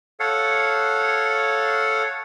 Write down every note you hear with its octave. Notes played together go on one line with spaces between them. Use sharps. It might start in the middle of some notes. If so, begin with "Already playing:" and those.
A4 C#5 F5 F#5